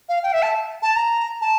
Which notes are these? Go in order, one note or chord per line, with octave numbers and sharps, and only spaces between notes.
F5
G5
E5
A5
A5
A#5
A5